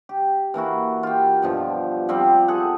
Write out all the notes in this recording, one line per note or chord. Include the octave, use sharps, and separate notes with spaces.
G4
E3 A#3 E4 F#4
F4 G4
G2 B2 F3
F3 G3 C4 G4
G#4 A4 F#5